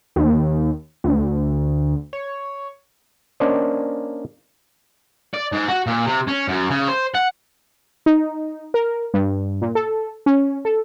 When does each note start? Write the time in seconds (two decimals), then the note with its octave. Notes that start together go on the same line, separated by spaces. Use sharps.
0.16 D#2
1.04 D2
2.13 C#5
3.40 A#3 C#4 D4 C5 D5 D#5
5.34 D5
5.52 G#2
5.68 F#4
5.87 A#2
6.06 C3
6.27 C#4
6.48 F#2
6.70 C#3
6.88 C5
7.15 F#5
8.06 D#4
8.74 A#4
9.14 G2
9.62 A#2
9.75 A4
10.26 C#4
10.65 A4